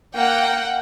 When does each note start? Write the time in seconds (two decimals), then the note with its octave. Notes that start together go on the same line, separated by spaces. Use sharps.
0.15 A#3 F#5 G5